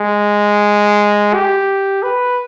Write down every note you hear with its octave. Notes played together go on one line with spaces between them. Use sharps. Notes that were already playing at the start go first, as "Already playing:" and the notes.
Already playing: G#3
G4
B4